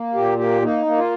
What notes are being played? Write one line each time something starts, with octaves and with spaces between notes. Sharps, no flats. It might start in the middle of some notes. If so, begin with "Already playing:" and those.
Already playing: A#3
A#2 G4
A#3 G4
A#3 D#4
A#3
F4